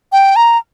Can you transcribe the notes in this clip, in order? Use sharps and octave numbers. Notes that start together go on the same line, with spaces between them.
G5
A#5